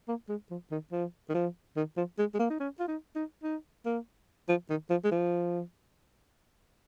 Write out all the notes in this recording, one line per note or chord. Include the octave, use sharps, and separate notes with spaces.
A#3
G#3
F3
D#3
F3
D#3
F3
D#3
F3
G#3
G#3
A#3
D#4
C#4
F4
D#4
D#4
D#4
A#3
F3
D#3
F3
G#3
F3